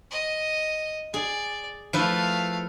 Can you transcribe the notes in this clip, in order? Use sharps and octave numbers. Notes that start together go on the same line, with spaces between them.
D#5
G#4 D5
F3 A3 E4 B4 F5